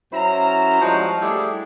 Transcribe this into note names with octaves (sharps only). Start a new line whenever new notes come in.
F#2 C#4 E4 C5 A#5
F3 G3 G#3 F#4
G3 A3 D4 E4 G#4